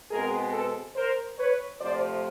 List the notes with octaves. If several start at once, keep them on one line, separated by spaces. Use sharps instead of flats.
B2 G#3 C4 G#4 A#4
A4 B4
A#4 C5
B4 C#5
C3 F3 A3 C5 D5